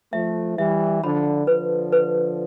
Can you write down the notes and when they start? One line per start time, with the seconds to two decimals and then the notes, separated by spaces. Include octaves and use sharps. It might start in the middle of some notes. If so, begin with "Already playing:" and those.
0.13 F3 A3 E5
0.58 E3 G3 E5
1.03 D3 F3 B5
1.47 D3 F3 B4
1.93 B4